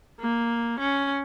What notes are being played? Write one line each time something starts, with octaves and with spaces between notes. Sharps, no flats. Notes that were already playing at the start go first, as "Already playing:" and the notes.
A#3
C#4